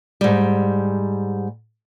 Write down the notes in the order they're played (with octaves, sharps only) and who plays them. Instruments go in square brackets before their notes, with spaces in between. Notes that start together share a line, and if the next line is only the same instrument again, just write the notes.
[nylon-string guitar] G#2 G3